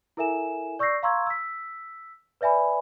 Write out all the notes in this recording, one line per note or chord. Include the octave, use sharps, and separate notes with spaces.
E4 A4 A#4 E5 G#5 E7
D5 C#6 E6 G6 A#6 C7
F5 A#5 C6 C#6 E6 G#6
E6 B6
B4 D5 E5 G#5 B5